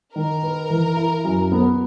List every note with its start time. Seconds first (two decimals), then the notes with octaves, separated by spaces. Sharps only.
0.15 D#3 A#4
0.43 B4
0.70 E3
0.97 E4
1.24 F#2
1.52 B3